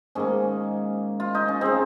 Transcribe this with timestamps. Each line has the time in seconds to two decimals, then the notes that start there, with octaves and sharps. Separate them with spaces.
0.15 G#2 D#3 A#3 C#4
1.20 F4
1.35 D#4
1.48 C#4
1.61 C#3 G#3 C4